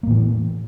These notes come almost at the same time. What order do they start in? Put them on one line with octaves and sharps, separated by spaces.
A#3 A2 E3